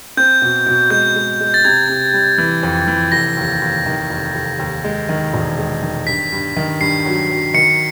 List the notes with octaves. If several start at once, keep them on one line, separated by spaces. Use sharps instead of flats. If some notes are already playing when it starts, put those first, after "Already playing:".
C4 G6
B2
B2
G#3 G6
G#3
G#3
A6
C3 G#6
C3
G3
E3
F2
E3
F1 A#6
D#2
D#2
D#3
F1
F1
D#2
G#3
D#3
E1
G#3
D#3
G2 B6
G2
D#3
G2 C7
F#3
F#3
D#3 C#7